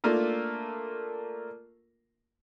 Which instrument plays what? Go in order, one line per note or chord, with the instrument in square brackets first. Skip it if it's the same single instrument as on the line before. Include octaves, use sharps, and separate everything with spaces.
[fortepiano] A3 A#3 D4 F4 A#4